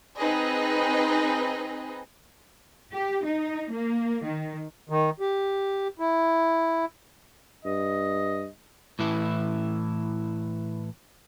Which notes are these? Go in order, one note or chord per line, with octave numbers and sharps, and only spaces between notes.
C4 D#4 G#4 B4 D#5
G4
D#4
A#3
D#3
D#3
G4
E4
G2 D#5
A2 E3 E4